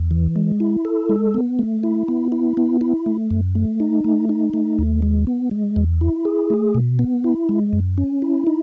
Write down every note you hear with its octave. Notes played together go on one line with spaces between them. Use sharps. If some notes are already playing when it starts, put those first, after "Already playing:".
Already playing: E2
E3
G#3
E4
A4
G#3
B3
A3
E4
B3
E4
B3
E4
A3
F#2
A3
D#4
A3
D#4
A3
D#2
G#3
B3
G#3
E2
E4
G#4
A3
B2
B3
E4
G#3
F#2
C#4
E4
D#4